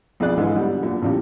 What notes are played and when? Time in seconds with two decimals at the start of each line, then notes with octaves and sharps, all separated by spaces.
0.20 B1 F2 E4 G#4 D5 F#6
0.37 G#2 D3 E3 G#3 F4 G#4
0.55 B2 D3 F#3 G3
0.82 F#2 A#2
1.02 A1 E2 A#2 C#3 G4